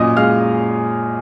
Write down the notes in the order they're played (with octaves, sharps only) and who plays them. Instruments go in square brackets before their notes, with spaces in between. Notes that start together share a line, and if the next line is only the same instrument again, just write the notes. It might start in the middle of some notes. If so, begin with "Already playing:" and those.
Already playing: [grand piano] F#2 A#2 D#5 D#6
G#3 F5 F6